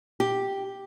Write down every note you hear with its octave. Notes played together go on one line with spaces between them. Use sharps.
G4